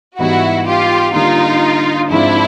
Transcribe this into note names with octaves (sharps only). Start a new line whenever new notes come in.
G#2 E3 G3 B3 D#4 E4 F#4
F4 G4
D3 G3 A#3 D#4 F4
G#2 F3 G#3 C4 D4 E4 F4